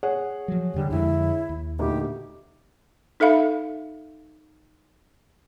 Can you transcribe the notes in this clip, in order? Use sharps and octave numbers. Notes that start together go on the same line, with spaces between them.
G#4 C#5 F#5
F3 F#3
E2 D3 G3
F2 D3 G#3 E4
D#2
D2 A#2 D#4 G4
D#4 A4 E5 F5 B5